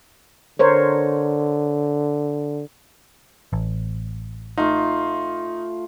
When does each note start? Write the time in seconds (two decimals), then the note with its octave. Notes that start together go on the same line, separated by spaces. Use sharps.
0.59 D3 A#4 C5 C#5
3.53 A1
4.57 A3 D#4 F4